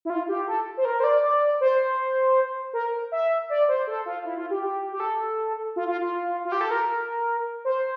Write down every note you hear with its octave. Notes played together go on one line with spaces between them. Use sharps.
E4
F4
G4
A4
C5
A#4
C5
D5
D5
C5
A#4
E5
D5
C5
A4
F4
E4
F4
G4
G4
G4
A4
F4
F4
F4
F4
G4
A4
A#4
C5